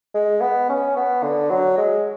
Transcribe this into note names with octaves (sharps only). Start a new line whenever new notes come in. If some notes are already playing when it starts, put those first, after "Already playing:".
G#3
B3
C#4
B3
D3
F#3
G#3